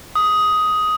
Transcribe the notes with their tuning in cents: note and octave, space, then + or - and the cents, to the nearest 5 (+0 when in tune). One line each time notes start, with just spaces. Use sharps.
D#6 +10